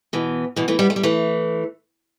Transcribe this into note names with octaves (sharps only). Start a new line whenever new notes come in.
B2 E3
B2 E3
E3 A3
G3 B3
A3
G3
E3 A3